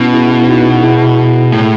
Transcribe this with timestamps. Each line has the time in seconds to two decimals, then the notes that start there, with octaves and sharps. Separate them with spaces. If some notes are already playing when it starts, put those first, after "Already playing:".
Already playing: B2 C#4 E4
0.13 E4 G#4
0.41 E4
0.48 D#4 F#4
0.83 E4 G#4
1.52 A2